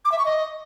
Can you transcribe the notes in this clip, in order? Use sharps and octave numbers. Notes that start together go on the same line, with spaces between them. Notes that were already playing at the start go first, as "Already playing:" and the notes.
D6
E5
C#6
D#5